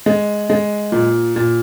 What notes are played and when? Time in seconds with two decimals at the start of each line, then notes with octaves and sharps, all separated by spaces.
0.06 G#3
0.50 G#3
0.92 A#2
1.36 A#2